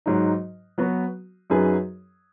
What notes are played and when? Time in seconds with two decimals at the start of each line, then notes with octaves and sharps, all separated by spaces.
0.06 G#2 F#3 D#4
0.78 F#3 B3 F#4 B4
1.50 F#2 F#3 D#4 G#4 B4